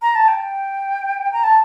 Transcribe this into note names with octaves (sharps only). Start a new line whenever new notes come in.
A#5
A5
G5
A#5
A5